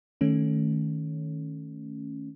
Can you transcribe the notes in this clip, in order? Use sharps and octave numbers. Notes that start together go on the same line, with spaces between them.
D#3 A3 C#4